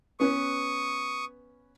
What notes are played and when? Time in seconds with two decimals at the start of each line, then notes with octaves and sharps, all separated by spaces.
0.20 B3 C#4 B4 C#6 D#6